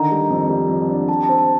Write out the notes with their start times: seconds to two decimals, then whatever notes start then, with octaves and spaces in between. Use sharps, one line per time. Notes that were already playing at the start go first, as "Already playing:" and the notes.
Already playing: D3 D#3 A#5
0.11 G3
0.30 F2
0.50 G3
0.69 F2
0.89 D4
1.09 G4 A5
1.23 A5
1.29 C4
1.38 A5